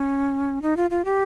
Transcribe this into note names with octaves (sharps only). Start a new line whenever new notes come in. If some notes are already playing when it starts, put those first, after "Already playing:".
Already playing: C#4
D#4
F4
F4
G4